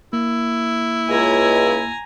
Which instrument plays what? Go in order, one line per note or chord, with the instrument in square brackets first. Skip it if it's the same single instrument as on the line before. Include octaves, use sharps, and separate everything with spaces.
[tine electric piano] A#3 [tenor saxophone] E4
[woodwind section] C#2 [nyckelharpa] G#5 A#5